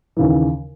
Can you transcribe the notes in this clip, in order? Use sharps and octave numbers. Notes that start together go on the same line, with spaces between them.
D#2 C#3 E3